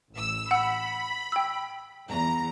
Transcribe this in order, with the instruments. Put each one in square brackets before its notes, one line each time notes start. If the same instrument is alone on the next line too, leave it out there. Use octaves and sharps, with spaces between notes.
[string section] A1 E6
[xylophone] F#5 E6 [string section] B5
[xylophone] G5 E6
[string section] E2 A#5